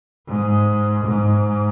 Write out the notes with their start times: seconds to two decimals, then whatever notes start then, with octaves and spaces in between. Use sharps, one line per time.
0.28 G#2
1.05 G#2